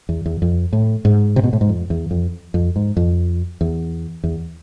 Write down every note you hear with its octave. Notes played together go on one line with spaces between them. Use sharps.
E2
E2
F2
A2
G#2
C3
B2
A2
G#2
F2
E2
F2
F2
G#2
F2
E2
E2